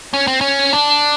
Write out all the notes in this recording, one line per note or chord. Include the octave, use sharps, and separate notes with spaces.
C#4
C4
C#4
D4